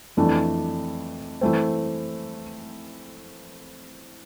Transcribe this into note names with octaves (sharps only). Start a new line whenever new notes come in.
F2 E3 A3 D4
E3 A3 C4